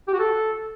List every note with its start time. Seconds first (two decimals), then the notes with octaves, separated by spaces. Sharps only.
0.08 G4
0.13 F#4
0.19 A4